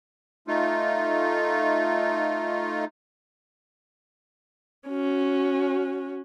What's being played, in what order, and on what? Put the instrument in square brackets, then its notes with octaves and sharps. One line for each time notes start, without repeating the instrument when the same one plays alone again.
[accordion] A3 D#4 F4
[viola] C#4 F#4